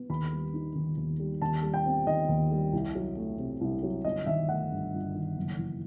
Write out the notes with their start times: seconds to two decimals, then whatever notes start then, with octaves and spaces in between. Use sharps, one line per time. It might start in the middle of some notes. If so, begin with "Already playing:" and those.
Already playing: B3
0.09 D#2 B5
0.32 G3
0.53 D#4
0.75 D#3
0.97 D#2
1.19 G3
1.42 D#2 A5
1.63 G3
1.74 G5
1.85 C4
2.06 D#3 D#5
2.29 D#2
2.51 G3
2.73 C2
2.95 F#3
3.17 A3
3.38 C3
3.61 C2
3.83 F#3
4.05 G1 D#5
4.26 D#3 E5
4.49 A3 F#5
4.71 G2
4.93 G1
5.15 D#3
5.37 F#1
5.58 E3